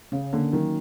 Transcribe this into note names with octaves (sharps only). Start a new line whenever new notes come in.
C#3 C#4
D3 A#3
D#3 F#3